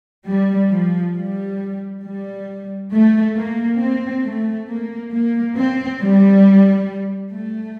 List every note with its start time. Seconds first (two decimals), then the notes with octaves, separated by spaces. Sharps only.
0.27 G3
0.71 F3
1.15 G3
2.03 G3
2.92 A3
3.36 A#3
3.79 C4
4.24 A3
4.68 A#3
5.12 A#3
5.56 C4
6.01 G3
7.33 A3